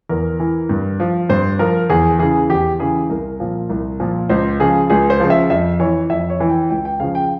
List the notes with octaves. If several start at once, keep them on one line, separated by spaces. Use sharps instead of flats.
E2 A#4
E3
G2
F3
G2 C5
F3 A#4
E2 G#4
C#3 E3 G#4
E2 G4
C#3 E3 G#4
C2 A#4
A#2 F3
C2
A#2 F3
C#2 C5
C#3 F3 G#4
C#2 G#4
C5
C#3 F3
E5
F2 E5
E3 C#5
F2 E5
C#5
E3
G5
C#2 G5
G5
C#3 F3 F5
G5